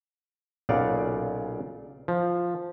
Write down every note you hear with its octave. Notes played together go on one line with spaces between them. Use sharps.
B1 A#2 C#3 D5 F5 F#5
F3